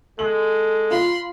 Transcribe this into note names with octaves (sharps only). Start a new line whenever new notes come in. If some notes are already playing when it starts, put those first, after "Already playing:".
G#3 A4 F#7
F4 B5 C6